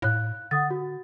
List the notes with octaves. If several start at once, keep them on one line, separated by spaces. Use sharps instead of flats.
A2 F5 F#6
D3 F#5 D#6 A6
F#4